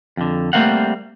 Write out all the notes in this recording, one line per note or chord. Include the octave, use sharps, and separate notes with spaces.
F2 D3
G3 A3 A#3 C4 F5 F#5